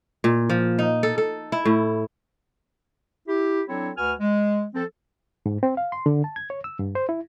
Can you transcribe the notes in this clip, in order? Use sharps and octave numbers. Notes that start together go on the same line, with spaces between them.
A#2
F3
D#4
A4
A4
E4
A2
E4 G4
F#3 C4 D4 E4 A4 C#5
D2 F#4 B4 G#5 F6
G#3
F3 C4 A4
G#2
C4
F5
C6
D3
A5
G#6
C#5
E6
G2
C5
E4